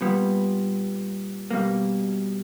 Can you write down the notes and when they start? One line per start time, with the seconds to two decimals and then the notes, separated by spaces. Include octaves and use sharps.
0.01 A#2 G3 B3
1.51 B2 G3 A#3